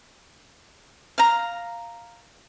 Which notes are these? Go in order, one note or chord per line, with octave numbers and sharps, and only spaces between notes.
F5 A#5